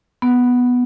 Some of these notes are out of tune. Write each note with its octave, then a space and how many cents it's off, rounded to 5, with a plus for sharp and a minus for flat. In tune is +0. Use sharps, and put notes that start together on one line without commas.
B3 +0